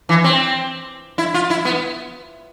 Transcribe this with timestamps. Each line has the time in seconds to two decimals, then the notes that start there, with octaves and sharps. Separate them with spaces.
0.09 E3
0.24 C4
1.18 E4
1.34 F4
1.50 E4
1.65 B3